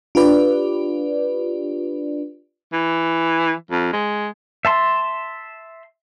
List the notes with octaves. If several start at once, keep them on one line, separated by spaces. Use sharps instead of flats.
D4 F4 G4 B4 D5
E3
F2
G#3
E5 A5 C6